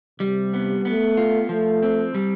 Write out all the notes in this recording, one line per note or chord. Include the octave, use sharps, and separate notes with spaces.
C3 G3
B3
A3 B3
F4
F3 A3
C4
G3